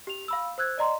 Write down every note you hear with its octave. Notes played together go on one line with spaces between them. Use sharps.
G4 F7
F5 B5 E6
C5 E6 F#6 G#6
D5 D#5 A#5 C6